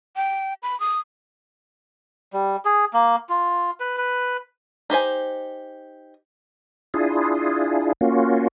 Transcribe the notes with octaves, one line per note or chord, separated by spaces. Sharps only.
G5
B5
D#6
G3
G#4
A#3
F4
B4
B4
D#4 G4 C5 G#5
D4 E4 F4 G#4
A#3 C#4 F4 F#4